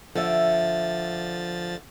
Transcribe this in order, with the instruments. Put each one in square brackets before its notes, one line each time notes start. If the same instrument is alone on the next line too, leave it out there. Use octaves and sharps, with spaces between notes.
[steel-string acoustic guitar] D3 E5 [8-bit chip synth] F3 A6